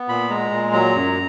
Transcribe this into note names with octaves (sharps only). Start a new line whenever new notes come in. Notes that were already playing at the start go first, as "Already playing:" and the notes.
Already playing: B3
A#2 B5
G#3 A#5
A#2
F#3 A#5
F#2